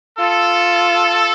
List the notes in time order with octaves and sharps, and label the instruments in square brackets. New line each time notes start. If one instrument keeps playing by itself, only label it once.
[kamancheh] F4 [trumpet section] A4